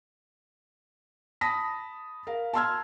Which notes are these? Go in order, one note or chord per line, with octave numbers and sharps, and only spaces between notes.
A5 B5 D#6 A#6 B6
A#4 F5
A5 A#5 C6 E6 F6 G#6